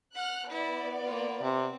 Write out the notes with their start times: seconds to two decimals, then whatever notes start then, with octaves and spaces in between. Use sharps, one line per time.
0.15 F#5 F6 F#6
0.49 B3 E4 D5
1.04 A#3 F4
1.42 C3 C4